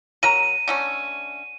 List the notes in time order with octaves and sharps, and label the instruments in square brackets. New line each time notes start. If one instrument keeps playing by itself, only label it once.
[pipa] F#3 A#4 A#5 [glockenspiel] D#7
[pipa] D3 A3 C#4